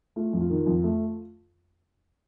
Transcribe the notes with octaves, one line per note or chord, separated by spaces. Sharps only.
A3 F4
F2
F4
D#3
F2
A3